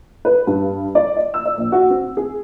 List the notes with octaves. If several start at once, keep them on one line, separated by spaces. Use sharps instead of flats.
B4
G2
D5
D#5
E6
D5
A#1
F#4
C4
G#4